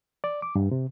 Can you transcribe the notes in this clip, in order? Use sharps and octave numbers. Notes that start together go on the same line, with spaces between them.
D5
D6
G2
C3